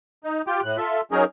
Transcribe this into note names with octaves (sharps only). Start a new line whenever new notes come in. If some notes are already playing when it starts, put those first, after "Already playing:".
D#4
F4 G4 G5
A2 F#6
F4 A4 E5
F#3 C#4 D#4 G#4 A#4